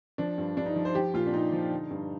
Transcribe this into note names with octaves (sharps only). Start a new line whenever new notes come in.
F3 D4
G2
G2 D4
D#4
F3
C5
F3 G4
A#2 F4
D4
A#2 D#4
F3
D3
G2